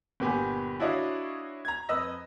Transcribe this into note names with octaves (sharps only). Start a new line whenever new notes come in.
G1 A#2 B3 G4 G#5
D4 E4 F#4 C#5 D#5 F5
A#5 G#6
F2 B4 D#5 E6 A#6